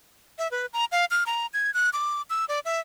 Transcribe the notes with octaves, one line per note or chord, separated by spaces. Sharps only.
E5
B4
A#5
F5
F6
A#5
G#6
F#6
D6
E6
D5
E5